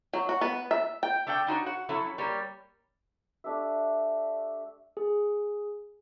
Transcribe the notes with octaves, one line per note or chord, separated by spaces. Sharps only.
F#3
F#4
B3
E5
G5
A3 D4 D5 F#5 G5
D4 D#4 F#4 C#5
F#4 F#5
F#3 C#4 E4 A4
G3 A#3 C#5
A3 D4 G4 E5
G#4